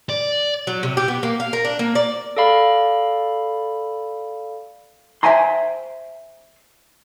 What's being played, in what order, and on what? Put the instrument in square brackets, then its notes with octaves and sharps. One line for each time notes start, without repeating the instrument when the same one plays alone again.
[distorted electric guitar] D5
[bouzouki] F#3
C3
G4
B3
A#3
F5
A#4
D4
A#3
D5
[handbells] A4 D5 F5 B5
[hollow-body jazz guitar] C5 E5 G5 G#5 A#5 C6